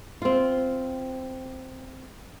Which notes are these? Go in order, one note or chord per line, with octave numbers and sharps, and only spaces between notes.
C4 F4